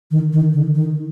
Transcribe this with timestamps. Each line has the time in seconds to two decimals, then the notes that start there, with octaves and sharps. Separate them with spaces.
0.11 D#3
0.33 D#3
0.54 D3
0.75 D#3